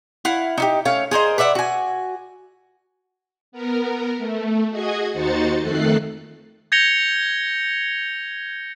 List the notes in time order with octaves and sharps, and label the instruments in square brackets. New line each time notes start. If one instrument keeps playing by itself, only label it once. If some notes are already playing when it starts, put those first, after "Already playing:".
[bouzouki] E4 F5 F#5
D#4 E4 G4
A3 C#4 C#5 F5
G#4 A#4 C5 D#5
B4 D5 E5 F#5
F#4 G#5
[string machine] B3 A#4
A3
F#4 G#4 D#5 G#6
D#2 D#4 F#4 C5 A6 C#7
F2 D#3 A3 A4 F#6 C7
[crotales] G6 G#6 A#6 C#7 F7 G7